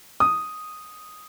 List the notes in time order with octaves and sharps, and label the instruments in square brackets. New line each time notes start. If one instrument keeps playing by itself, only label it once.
[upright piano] D#6